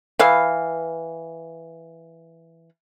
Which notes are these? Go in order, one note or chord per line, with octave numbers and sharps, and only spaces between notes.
E3 B4 F5